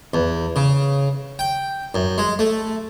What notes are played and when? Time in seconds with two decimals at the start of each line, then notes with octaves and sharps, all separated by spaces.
0.14 E2
0.56 C#3
1.39 G5
1.95 F#2
2.18 G#3
2.39 A3